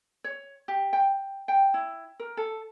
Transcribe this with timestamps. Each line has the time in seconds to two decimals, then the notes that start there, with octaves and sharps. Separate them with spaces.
0.24 C#5
0.68 G4
0.93 G5
1.48 G5
1.74 E4
2.20 A#4
2.37 A4